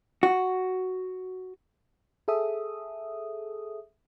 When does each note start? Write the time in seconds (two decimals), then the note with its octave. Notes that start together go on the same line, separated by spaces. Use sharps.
0.23 F#4
2.28 G#4 A4 E5 D#6